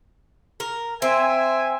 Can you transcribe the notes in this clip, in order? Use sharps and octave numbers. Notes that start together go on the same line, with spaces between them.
A#4
C4 E5 G#5